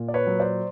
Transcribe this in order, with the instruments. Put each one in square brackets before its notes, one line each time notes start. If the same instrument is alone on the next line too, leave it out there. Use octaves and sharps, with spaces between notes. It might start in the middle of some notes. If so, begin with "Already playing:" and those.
Already playing: [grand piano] A#2
D5
B4 C#5
F#3
C5 D5